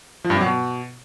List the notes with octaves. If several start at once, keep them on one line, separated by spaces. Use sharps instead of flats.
F3
G2
C3
F#3
B2